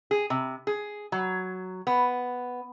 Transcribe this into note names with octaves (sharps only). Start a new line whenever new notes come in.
G#4
C3
G#4
F#3
B3